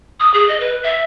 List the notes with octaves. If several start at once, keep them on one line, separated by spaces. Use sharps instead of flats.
D#6
G#4
D#5
B4
E5